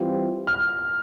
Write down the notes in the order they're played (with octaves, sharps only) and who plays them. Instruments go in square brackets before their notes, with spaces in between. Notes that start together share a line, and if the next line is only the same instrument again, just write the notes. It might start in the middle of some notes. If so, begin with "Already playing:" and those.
Already playing: [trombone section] E3 G3 C4 F4
[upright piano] F6